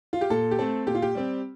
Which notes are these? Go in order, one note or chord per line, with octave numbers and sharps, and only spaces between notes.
F4
G4
A#2 A4
G4
A3 C4 A4
A#2 G4
F4
G4
G3 C4